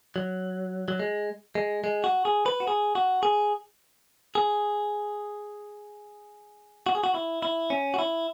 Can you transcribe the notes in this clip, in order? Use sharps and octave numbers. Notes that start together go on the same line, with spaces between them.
F#3
F#3
G#3
G#3
G#3
F#4
G#4
B4
F#4
G#4
F#4
G#4
G#4
F#4
G#4
F#4
E4
E4
C#4
F#4
E4